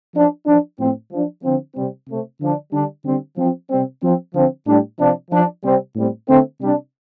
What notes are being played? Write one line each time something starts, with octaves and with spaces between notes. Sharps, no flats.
F3 D4
F3 D4
A2 F3 C4
F3 D4
D3 F3 C4
C3 G3 C4
C3 A3 C4
D3 F3 D4
D3 G3 D4
D3 G3 C4
F3 C4
C3 G3 C4
F3 C4
D3 F3 C4
A2 G3 D4
C3 F3 D4
F3 D4
C3 G3 C4
A2 G3 C4
D3 A3 C4
C3 G3 D4